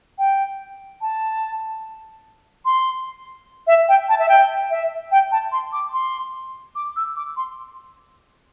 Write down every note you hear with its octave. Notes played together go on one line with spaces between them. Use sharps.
G5
A5
C6
E5
G5
A5
E5
G5
E5
G5
A5
C6
D6
C6
D6
E6
D6
C6